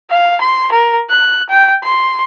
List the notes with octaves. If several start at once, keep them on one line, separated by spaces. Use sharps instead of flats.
F5
C6
A#4
F#6
G5
C6